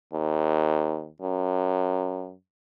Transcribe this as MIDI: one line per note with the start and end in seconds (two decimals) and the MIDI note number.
0.14 1.08 39
1.22 2.33 42